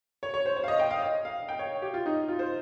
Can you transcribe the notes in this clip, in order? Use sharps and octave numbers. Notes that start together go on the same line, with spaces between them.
C#5
C#5
C5
C#5
F5
D#5
G5
F5
D#5
F5
G5
C#5
G4
F4
D#4
F4
C5